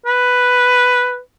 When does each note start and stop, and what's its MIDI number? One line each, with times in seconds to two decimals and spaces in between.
0.06 1.19 71